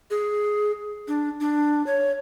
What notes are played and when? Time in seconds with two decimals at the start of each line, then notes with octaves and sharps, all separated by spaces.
0.11 G#4
1.08 D4
1.41 D4
1.87 C#5